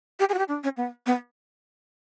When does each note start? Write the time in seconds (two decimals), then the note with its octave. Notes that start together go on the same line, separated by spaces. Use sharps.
0.20 G4
0.29 G#4
0.34 F#4
0.39 G4
0.48 D4
0.64 C#4
0.77 B3
1.06 B3